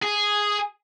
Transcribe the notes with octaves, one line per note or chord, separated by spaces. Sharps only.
G#4